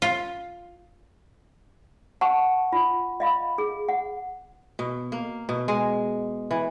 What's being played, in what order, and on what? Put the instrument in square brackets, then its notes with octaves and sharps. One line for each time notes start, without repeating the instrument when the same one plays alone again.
[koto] F4
[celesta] F#5 C#6 [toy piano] A5
[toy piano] F4
D#5 F5 B5
G#4
F#5
[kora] B2
A#3
B2
G#3
E3